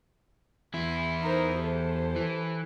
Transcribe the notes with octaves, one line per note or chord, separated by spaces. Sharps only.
E2 E4 C6
D#4 A#4 C5
G4 A4 C5
E3